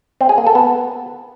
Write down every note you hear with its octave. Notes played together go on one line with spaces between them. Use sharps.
C4
G#4
A#3
A4
B3